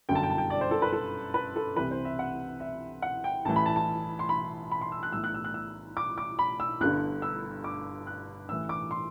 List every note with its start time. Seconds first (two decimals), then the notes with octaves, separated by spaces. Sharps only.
0.09 G1 F#2 D3 G5
0.15 A5
0.23 G5
0.30 A5
0.38 G5
0.50 D5
0.61 C5
0.71 A4
0.82 B4
0.93 A4
1.34 B4
1.56 A4
1.76 C2 C3 E3 B4
1.91 C5
2.05 E5
2.19 F#5
2.60 E5
3.02 F#5
3.24 G5
3.45 A1 A2 E3 A5
3.56 B5
3.66 A5
3.76 A5
4.19 C6
4.29 B5
4.71 B5
4.81 C6
4.92 E6
5.03 F#6
5.12 B1 A2 E3 E6
5.24 F#6
5.34 E6
5.44 F#6
5.54 E6
5.97 D6
6.18 D6
6.39 B5
6.60 E6
6.81 G1 G2 D3 F#6
7.22 E6
7.64 D6
8.07 F#6
8.49 A1 A2 E3 E6
8.69 D6
8.91 C6